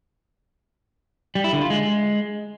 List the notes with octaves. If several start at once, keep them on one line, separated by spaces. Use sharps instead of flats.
G3
E4
D3
F4
G#3